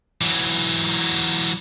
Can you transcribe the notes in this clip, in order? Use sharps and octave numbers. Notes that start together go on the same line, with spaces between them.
E3 F#3